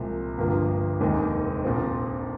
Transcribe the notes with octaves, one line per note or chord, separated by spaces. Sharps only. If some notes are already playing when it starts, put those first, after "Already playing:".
Already playing: C2 A#2 F3 G#3 C4
G1 G2 F3 A#3
F1 D#2 D#3 G#3 C4
A#1 A#2 F3 C4